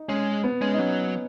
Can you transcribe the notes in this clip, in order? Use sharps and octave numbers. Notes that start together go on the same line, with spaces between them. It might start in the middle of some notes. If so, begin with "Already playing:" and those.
Already playing: D#4
G#3 C#4
B3
G#3 C#4
D#4
F#3 C#4